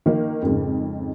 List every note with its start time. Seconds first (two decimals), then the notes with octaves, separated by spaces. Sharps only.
0.06 D#3 A#3
0.42 F2 G#2 C#3